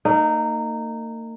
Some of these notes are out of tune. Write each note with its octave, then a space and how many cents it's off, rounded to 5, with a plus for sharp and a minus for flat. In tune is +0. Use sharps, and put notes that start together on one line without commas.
A#3 -40 D#4 -15